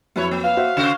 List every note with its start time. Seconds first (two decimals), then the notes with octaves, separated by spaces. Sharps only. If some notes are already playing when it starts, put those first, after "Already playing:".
0.16 F2 F#3 E4 B4 C#5
0.31 A#3
0.44 B4 F5
0.57 F#4 C5 E5
0.77 C#3 F#4 C5 E7